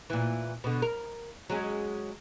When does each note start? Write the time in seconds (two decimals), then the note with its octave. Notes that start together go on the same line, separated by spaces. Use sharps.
0.10 A#2 E3
0.64 B2 D3
0.82 A#4
1.49 F#3 G#3 C#4